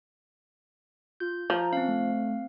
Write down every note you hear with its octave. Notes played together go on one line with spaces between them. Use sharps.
F4 G6
F3 A#5
C4 C#4 F5
A3